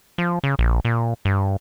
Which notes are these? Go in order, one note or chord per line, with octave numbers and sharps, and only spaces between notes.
F3
C#3
A#1
A#2
G2